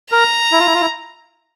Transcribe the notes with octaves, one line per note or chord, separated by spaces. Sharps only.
A#4 A#5
E4
F4
E4
F4
E4